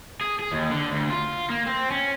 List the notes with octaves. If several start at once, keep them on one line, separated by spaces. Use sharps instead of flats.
G#4
G#4
D#2
D3
D2
F4
A#3
C4
C#4